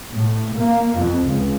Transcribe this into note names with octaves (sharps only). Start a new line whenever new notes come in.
A2
A#3
F2
C#2